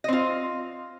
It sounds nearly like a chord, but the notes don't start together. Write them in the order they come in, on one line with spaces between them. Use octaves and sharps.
D#5 C4 F4